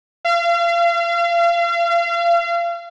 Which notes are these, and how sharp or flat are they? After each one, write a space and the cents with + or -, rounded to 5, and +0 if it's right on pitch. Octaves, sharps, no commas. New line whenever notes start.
F5 -35